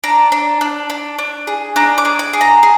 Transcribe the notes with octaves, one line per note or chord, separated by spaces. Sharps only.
D4 A#5
D4
D4
D4
D4
G#4
D4 A#5
D6
G#4
D6
G#4
A#5
G#4